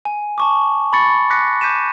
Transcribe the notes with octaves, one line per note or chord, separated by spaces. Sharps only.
G#5
A5 C#6 D6
B5 C#6 A6 C#7
D6 F#6 A#6 B6 C#7
D6 G6 B6 D#7 E7